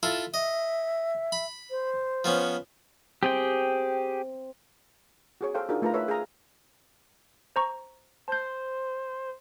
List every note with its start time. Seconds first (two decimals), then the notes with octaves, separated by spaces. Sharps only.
0.03 E4 F4 A4
0.34 D#5 E5
1.32 B5
1.71 C5
2.24 F3 B3 C#4
3.23 C4 G4 G#4 G5
5.41 F#4 G#4 C#5
5.55 A4 C5 F5 G5
5.69 D4 D#4 F4 F#4 G#4 A#4
5.82 A3 F4 A#4 B4 A#5
5.94 A4 B4 C#5 E5
6.08 G#4 F5 A#5
7.56 C5 A#5 C#6
8.28 C5 A5 G6